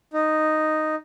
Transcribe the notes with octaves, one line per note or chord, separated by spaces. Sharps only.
D#4